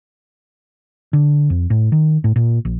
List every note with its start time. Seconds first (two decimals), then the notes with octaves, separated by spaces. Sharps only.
1.13 D3
1.50 F2
1.70 A2
1.92 D#3
2.24 A2
2.36 A#2
2.65 A#1